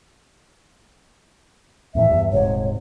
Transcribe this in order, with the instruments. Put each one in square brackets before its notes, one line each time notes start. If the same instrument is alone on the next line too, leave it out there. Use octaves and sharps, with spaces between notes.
[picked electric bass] E2 A2 E3 [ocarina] E5
[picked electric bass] E2 G2
[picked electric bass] D#1 G#2 C3 [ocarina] C#5